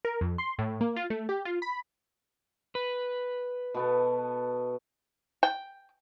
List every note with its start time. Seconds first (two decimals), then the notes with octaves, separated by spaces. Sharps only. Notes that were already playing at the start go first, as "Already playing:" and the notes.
0.05 A#4
0.21 F2
0.38 C6
0.58 A2
0.81 A#3
0.96 F4
1.10 A3
1.29 G4
1.45 F4
1.62 B5
2.75 B4
3.74 B2 B3 A4
5.43 G5